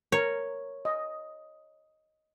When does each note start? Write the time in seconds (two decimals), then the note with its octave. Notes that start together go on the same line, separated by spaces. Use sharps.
0.12 A#4 C#5
0.85 D#5